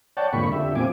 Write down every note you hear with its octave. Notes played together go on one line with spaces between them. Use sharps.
C#5 D5 F#5 G5 A5
F2 G#2 D3 A#3 B5 C#6
F2 D3 G4 E5
A#2 F3 C4 G#5 D6